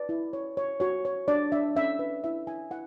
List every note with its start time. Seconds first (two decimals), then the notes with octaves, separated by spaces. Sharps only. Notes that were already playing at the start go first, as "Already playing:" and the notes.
Already playing: B4 D5
0.09 E4
0.33 C#5
0.57 C#5
0.80 F#4 C#5
1.05 C#5
1.28 D4 D5
1.52 D4 E5
1.75 C#4 E5
1.99 B4
2.24 E4 E5
2.47 E4 G#5
2.71 E4 F#5